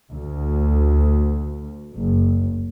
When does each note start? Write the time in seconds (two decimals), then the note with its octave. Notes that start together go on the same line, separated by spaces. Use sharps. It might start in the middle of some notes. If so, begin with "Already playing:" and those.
0.14 D2
1.94 F#1